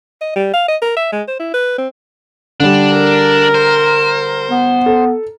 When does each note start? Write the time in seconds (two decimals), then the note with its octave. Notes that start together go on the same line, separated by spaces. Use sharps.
0.21 D#5
0.36 G3
0.54 F5
0.68 D#5
0.82 A#4
0.97 E5
1.13 G#3
1.28 C5
1.39 E4
1.54 B4
1.78 C4
2.60 D3 G3 D4
2.93 A#4
3.55 C5
4.50 B3
4.86 A4